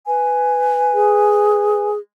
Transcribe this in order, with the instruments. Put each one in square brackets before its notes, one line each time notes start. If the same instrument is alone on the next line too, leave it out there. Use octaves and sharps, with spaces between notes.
[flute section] B4 G#5
[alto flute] G#4